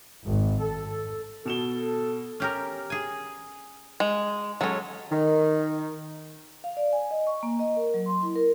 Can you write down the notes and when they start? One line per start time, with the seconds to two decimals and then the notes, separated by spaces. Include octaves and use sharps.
0.24 G#1
0.62 A4
1.45 B2 A4 E7 G7
2.40 C#4 G4 A#4
2.90 G#4 G#5
4.00 G#3
4.61 F#3 G#3 C#4 A4
5.11 D#3
6.64 F5
6.77 D5
6.93 G#5
7.11 D#5
7.27 C#6
7.43 A#3
7.59 D#5
7.77 A#4
7.94 F#3
8.06 C6
8.22 E4
8.36 A#4